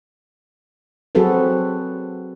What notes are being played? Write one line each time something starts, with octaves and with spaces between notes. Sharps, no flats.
F#3 C4 F#4 G#4 A4 B4